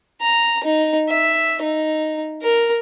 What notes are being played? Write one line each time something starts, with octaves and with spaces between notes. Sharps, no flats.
A#5
D#4
E5
D#4
A#4